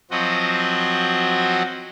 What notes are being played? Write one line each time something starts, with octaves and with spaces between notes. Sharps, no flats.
F3 F#3 C4 F#4 D#5